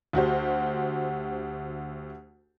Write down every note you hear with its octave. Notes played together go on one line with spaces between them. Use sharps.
D2 F#4 G4 C5